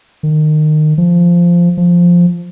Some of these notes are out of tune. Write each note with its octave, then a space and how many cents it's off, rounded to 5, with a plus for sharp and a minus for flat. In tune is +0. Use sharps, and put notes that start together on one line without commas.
D#3 -25
F3 -10
F3 +0